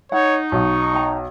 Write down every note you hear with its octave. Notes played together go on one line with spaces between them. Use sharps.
D#4 C#5 F#5
B1 C#6
D#5 G5 A#5